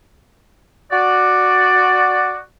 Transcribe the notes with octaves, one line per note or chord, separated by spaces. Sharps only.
F#4 D5